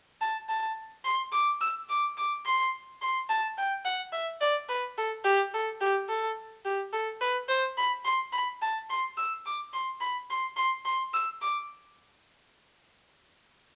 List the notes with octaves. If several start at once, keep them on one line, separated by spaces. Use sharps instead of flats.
A5
A5
C6
D6
E6
D6
D6
C6
C6
A5
G5
F#5
E5
D5
B4
A4
G4
A4
G4
A4
G4
A4
B4
C5
B5
C6
B5
A5
C6
E6
D6
C6
B5
C6
C6
C6
E6
D6